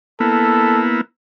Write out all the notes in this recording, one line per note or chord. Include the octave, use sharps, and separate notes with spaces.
A#3 B3 E4 A4